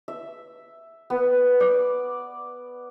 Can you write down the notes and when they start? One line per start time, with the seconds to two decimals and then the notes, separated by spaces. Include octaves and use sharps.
0.08 E5
1.10 B3
1.60 D5